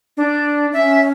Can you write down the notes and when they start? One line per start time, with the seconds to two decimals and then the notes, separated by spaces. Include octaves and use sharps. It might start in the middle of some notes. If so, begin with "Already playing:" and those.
0.17 D4
0.73 C#4 E5